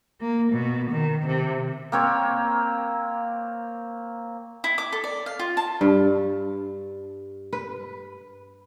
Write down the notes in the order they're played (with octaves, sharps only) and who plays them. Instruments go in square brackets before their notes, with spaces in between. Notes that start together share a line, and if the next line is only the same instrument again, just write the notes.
[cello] A#3
B2
D#3
C3
[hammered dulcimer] A#3 C4 C#5
[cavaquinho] E4
D6
A4
D5
F5
F4
A5
[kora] G2
B4